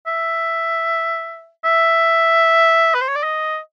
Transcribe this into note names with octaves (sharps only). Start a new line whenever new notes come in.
E5
E5
B4
C5
C#5
D5
D#5